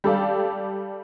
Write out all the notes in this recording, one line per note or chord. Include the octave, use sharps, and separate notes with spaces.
G3 A4 D5 F5